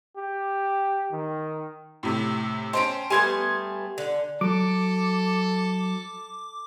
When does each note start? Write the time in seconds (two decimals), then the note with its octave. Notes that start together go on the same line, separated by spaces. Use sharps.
0.16 G4
1.12 D#3
2.03 A2 C3
2.73 C#4 C5 G5 A5 D7
3.10 G3 A3 B3 G#5 C6 G#6
3.98 D3
4.41 F#3 A4 D6